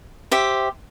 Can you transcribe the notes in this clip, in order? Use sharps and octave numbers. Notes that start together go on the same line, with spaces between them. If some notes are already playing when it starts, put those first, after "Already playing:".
G4 C5 E5